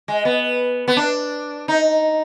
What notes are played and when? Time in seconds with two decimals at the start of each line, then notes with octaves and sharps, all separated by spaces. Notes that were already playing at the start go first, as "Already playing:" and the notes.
0.08 G#3
0.25 B3
0.88 B3
0.97 D4
1.68 D#4